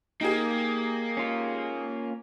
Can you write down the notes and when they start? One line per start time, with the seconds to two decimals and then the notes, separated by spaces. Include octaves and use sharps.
0.21 A#3 D#4 G4 G#4
1.17 C#4 F4